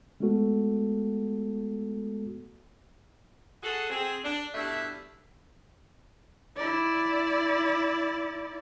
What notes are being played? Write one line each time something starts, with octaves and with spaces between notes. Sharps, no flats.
G#3 A3 B3 F#4 A4
F#4 G#4 A4
C4 G#4
D4
G2 B2 A3 D4 E4 E5
E4 D5